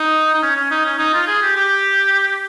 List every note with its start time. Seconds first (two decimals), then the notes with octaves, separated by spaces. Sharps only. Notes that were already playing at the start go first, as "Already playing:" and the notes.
Already playing: D#4
0.34 D#4
0.43 C#4
0.56 C#4
0.71 D#4
0.85 C#4
0.99 D#4
1.14 F4
1.27 G#4
1.42 G4
1.56 G4